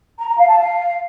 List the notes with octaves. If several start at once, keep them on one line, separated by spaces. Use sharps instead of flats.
A#5
A#5
F5
A5
F5